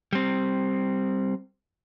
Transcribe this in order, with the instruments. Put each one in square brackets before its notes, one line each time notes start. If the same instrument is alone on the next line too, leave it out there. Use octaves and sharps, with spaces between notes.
[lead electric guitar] G3 C4